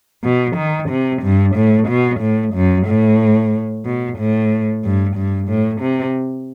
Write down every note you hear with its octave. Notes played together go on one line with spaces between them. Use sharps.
B2
D#3
C3
G2
A2
B2
A2
F#2
A2
B2
A2
G2
G2
A2
C3